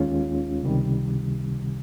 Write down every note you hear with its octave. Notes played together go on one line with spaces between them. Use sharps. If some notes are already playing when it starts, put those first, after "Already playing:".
Already playing: D#2 D#3 G#3 C#4 F4
C#2 C3 D#3 G3